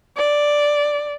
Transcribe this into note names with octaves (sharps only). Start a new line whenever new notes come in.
D5